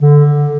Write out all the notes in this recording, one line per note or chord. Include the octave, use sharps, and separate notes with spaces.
D3